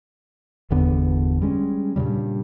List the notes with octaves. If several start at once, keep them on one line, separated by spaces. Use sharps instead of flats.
G1 E2 D3 B3
G3 G#3 C#4
G2 A#2 C#3 G3